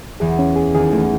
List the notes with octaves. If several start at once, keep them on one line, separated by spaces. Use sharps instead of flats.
E2 E3 G#4
C#4
G#4
D#2 D#3 G#4
E2 E3 A3